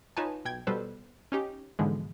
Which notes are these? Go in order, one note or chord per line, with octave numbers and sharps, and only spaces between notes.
D#4 F4 B4 C#5 G#5 A5
B1 G5 G#6
B2 G3 A4 B4 C5
C#4 D#4 G4
G#2 B2 D3 E3 F3 G#3